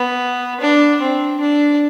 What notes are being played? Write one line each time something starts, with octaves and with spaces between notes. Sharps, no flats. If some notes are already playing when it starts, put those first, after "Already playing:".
Already playing: B3
D4
C4
D4